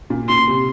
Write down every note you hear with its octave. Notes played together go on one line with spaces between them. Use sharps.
A#2
A#2 C6
C3